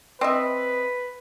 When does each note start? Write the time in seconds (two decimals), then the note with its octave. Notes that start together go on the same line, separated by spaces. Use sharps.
0.21 C4 B4 D#5 E5